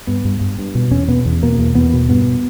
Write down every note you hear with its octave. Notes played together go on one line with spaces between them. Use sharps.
G2 B3
G2
G2
G2
B2
E2 C#4
B2 B3
E2
B2 A#3
E2
E2 B3
B2
G2 B3